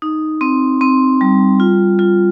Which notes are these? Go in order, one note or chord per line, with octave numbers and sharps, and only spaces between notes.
D#4
C4
C4
G3
F4
F4